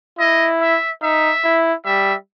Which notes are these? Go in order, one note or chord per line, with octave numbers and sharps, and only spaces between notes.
E4 D#5
E5
D#4 E5
E4
G3 E5